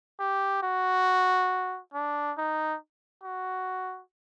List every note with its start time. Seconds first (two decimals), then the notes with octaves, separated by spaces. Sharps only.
0.20 G4
0.63 F#4
1.94 D4
2.38 D#4
3.23 F#4